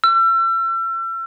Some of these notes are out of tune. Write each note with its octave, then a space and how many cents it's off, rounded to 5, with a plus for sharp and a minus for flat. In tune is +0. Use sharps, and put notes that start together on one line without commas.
E6 +40